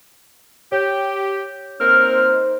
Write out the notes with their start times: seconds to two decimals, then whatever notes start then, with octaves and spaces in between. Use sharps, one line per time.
0.72 G4 C#5 G6
1.80 A#3 C4 D#4 A#4 C5 F6